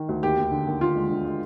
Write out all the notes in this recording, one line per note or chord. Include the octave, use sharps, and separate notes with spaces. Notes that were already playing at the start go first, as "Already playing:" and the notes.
Already playing: D#3
D2
D#2 G4
D#2
D3
D#2
D3 F4
G#3
D3
G#3